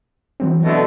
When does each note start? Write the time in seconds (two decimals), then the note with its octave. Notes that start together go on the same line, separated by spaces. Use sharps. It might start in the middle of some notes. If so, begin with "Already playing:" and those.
0.40 E3 F#3 C4
0.64 B2 D3 A3